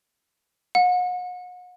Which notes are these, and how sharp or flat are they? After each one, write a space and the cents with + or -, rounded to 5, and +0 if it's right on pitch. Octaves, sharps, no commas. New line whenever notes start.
F#5 -40